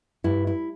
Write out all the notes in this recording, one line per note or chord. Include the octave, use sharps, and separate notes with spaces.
G2 E4
E4